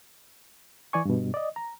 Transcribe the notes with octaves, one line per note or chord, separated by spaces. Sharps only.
E3 D5 G#5 C#6
G2 B2
D5 D#5
A#5